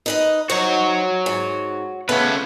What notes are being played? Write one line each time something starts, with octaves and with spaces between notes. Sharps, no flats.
D#4 B4 D#5
D#4 F#4 C5 C#5
G#2
C#3 A3 B3 C#4 B4